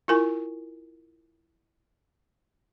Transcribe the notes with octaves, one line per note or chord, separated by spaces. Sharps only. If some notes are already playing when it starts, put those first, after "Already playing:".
E4 F4 A#4 G#5 C#6